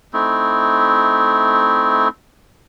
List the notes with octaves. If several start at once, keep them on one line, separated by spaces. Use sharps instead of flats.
A3 C4 D#4 E4